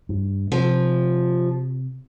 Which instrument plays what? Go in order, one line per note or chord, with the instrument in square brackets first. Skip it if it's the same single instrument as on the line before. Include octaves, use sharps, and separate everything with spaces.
[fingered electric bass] G2
[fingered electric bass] C3 [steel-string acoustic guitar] F3